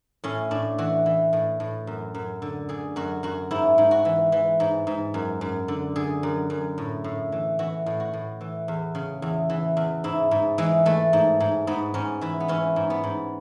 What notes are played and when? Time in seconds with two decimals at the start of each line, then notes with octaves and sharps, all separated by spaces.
0.24 A2 C#4
0.51 A2 D4
0.78 E3 F#4
1.06 E3
1.33 A2
1.60 A2
1.87 F#2
2.15 F#2
2.42 D3
2.69 D3 G#4
2.96 F#2 F#4
3.23 F#2 F#4
3.51 G#2 E4
3.78 G#2
3.91 F#4
4.05 E3
4.32 E3
4.60 G#2
4.87 G#2
5.14 F#2
5.41 F#2
5.68 D3
5.96 D3 G#4
6.23 F#2
6.50 F#2
6.78 A2
7.04 A2
7.32 E3
7.59 E3 F#4
7.86 A2
8.00 F#4
8.13 A2
8.41 E3
8.68 E2
8.95 C#3
9.22 E2
9.50 E3
9.77 E2
10.04 G#2 E4
10.31 G#2
10.58 E3 G#3
10.86 E3 A3
11.13 G#2
11.40 G#2
11.67 G#2 B3
11.94 G#2 C#4
12.21 E3 E4
12.40 B3
12.48 E3 C#4
12.76 G#2
12.90 B3
13.04 G#2